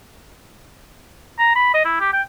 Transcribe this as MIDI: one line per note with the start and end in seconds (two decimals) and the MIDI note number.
1.39 1.54 82
1.56 1.70 83
1.74 1.85 75
1.85 1.97 64
2.00 2.11 67
2.13 2.22 79